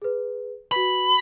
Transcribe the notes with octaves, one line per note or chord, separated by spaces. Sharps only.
G#4 B4
F#4 B4 B5